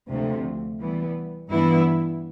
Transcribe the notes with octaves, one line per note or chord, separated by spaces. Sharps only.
D2 C3 F3 A3
E3 G3 B3
G2 E3 B3 E4